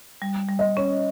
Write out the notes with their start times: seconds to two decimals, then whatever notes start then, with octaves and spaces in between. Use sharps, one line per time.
0.22 G3
0.49 G3
0.59 D#5
0.77 C#4 C#5